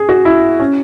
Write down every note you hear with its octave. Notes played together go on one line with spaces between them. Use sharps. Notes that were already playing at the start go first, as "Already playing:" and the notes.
Already playing: G#4
F#4
E4
C#4